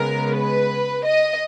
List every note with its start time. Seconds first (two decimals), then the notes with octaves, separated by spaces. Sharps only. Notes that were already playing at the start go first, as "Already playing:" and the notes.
Already playing: C#3 G#3 B3 A#4
0.37 B4
1.06 D#5